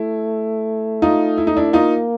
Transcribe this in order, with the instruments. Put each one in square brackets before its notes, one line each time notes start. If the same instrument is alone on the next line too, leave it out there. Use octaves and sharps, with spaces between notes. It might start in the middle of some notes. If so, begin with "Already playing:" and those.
Already playing: [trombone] A3 [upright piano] E4
[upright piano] D#4 F4
E4
D#4
D4 E4
[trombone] A#3 [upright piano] D#4 F4